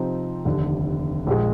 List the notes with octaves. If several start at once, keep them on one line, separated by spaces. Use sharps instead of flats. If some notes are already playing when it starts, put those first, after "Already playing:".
Already playing: C3 F3 C4 D#4
F1 D#2 D3
A#1 A#2 G#3